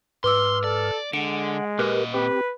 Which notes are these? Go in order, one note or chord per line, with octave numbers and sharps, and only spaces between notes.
G#2 B4 C6 D6 E6 F6
A4 D5
D3 G#3 F#5 D7
A#2 G4 A#4 B4 D#5
C4 G4 B4